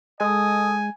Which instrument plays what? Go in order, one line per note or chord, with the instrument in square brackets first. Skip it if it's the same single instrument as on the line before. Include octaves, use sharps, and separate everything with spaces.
[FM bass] G#3 [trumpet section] A4 D#5 D#6 [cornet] G#5